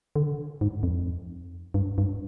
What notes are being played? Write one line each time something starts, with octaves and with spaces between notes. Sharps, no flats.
D3
G#2
F2
G2
G2